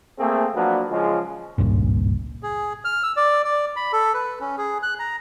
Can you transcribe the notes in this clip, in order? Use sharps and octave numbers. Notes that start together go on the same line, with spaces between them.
A3 A#3 C4 G#4
F3 F#3 A#3 B3 D4
C#3 F3 G#3
G#1 C#2 G2 A#2
G#4
F6
E6
D5
D5
B5
A4
B4
C#4
G#4
F#6
A#5